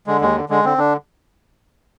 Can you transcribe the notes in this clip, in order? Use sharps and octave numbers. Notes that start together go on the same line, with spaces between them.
D3 G#3
D#2 G#3
D3
D3 G#3
D3 C4
D3 D4